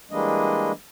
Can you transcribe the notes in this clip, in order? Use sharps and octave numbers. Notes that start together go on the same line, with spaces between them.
E3 G3 G#3 A#3 D4 D#5